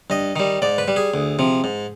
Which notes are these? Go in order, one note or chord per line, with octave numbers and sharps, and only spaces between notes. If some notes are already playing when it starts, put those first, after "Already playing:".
G2 D#5
D#3 G3
G#2 D5
B4
G3
G#4
D2
C3 F3
G#2